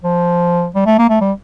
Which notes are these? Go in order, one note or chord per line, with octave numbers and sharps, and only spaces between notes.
F3
G3
A3
A#3
A3
G3